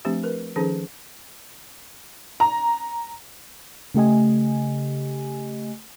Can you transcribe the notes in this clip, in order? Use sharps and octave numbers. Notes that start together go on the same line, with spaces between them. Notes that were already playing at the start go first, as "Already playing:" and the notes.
F3 A3 C4 D4 G4
A#4 B4
D#3 F3 C#4 D#4 G#4 A4
A#5
C#3 A3 G4 D#5 G#5